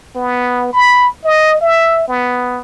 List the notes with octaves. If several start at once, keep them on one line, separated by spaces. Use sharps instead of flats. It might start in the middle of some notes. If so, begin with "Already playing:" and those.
B3
B5
D#5
E5
B3